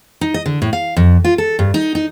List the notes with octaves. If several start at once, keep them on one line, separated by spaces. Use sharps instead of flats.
D#4
D#5
D3
A2
F5
F2
F4
A4
G2
D#4
D#4